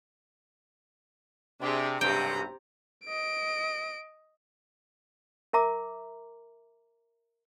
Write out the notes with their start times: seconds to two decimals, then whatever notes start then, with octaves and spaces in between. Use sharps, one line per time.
1.60 C3 D4 G4 G#4
2.01 B1 G2 C3 G5 A#5
3.05 D#5 D7
5.53 A#4 E5 A#5 D6